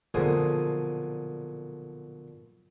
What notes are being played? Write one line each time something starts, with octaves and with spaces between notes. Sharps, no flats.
B1 A#2 D3 F3 G#4 D#6